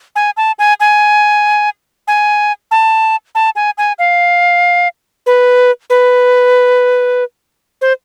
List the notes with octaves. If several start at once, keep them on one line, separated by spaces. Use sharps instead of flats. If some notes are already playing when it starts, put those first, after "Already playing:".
G#5
A5
G#5
G#5
G#5
A5
A5
G#5
G#5
F5
B4
B4
C5